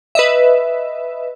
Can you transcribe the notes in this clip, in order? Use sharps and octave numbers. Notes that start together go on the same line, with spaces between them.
B4 D#5 E5